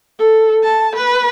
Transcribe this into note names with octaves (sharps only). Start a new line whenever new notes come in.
A4
A5
B4